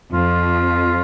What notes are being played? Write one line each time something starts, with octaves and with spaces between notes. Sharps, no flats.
F2 F4